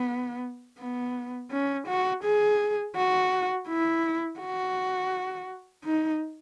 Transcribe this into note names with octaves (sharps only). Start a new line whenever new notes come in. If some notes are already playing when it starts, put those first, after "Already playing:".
Already playing: B3
B3
C#4
F#4
G#4
F#4
E4
F#4
D#4